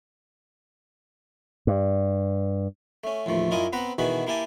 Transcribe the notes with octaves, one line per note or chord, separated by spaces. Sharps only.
G2
A3 C#4
A1 D#2 F3 A3
F#2 E4 F4 D#5 G#5 A#5
B3 C4 B4 F#5 A#5
B2 D#3 E3 F#4 G#4 B4
A#3 E4 G4 G#5 A5